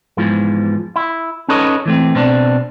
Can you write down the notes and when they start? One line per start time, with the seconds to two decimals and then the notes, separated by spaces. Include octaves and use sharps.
0.17 E2 G#2 E3 F3
0.96 E4
1.49 C#4 D#4 A4 B4 C#5 D#5
1.86 E3 A3 C4
2.15 B2 C4 D4